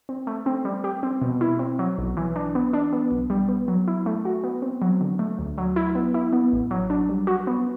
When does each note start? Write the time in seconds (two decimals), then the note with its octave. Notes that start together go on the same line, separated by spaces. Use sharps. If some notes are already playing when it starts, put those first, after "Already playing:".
0.09 C4
0.27 A3
0.46 C4
0.65 G3
0.84 G4
1.03 C4
1.22 B2
1.41 E4
1.59 C4
1.79 F#3
1.98 B1
2.17 E3
2.36 D4
2.55 B3
2.73 D4
2.93 B3
3.11 B1
3.30 G3
3.49 B3
3.68 F#3
3.87 E4
4.06 A3
4.25 F#4
4.44 B3
4.62 C4
4.82 F#3
5.01 D3
5.19 A3
5.39 D2
5.58 F#3
5.76 E4
5.95 B3
6.14 E4
6.33 B3
6.52 A1
6.71 F#3
6.90 D4
7.09 G3
7.27 F#4
7.47 B3